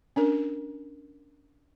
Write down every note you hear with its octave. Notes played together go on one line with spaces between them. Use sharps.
C#4 D4 A#4